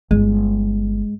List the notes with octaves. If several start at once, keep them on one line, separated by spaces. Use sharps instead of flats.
G1 G#3